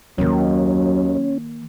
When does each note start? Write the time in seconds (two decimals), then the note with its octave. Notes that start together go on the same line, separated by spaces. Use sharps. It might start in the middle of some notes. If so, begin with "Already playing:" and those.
0.18 D#2 D#3 F#3 A#3 C#4